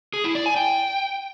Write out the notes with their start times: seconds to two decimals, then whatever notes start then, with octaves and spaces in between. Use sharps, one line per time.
0.14 G#4
0.24 E4
0.35 D5
0.46 G#5
0.56 G5